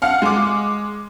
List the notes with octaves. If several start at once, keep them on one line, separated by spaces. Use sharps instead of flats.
F5 F#5 F6 C#7
G#3 D6